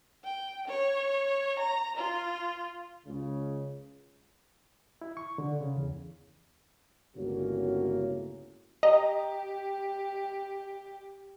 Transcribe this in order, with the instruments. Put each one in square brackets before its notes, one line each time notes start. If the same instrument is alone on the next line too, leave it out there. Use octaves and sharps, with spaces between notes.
[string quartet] G5
C#5
A#5
F4
[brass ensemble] C#2 C#3
[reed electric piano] E4
C#6
D3
C#3
E2
[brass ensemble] G1 C#2 A2 A#3 C#4 F#4
[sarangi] G4 [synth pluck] D#5 A#5